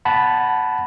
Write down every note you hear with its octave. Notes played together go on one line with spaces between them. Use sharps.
F#5 A5 B5